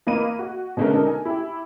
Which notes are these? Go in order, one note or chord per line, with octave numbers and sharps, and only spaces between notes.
E3 A#3 A#4 D#5 B5 D#7
F#4
B2 D3 G#3 A3 C#4 A#4
D4 D#4 A4 A#4
G#5
E4 G4